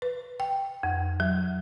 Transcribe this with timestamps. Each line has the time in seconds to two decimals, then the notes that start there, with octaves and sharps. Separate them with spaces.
0.02 B4
0.40 G5
0.83 F2
1.20 F#3